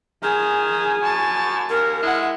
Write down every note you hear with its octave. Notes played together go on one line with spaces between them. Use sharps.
D#3 G#4 G#5
F#2 A5 C#6
D#2 A#4
G#3 E4 F#5